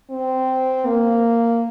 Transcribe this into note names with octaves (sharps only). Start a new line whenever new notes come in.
C4
A#3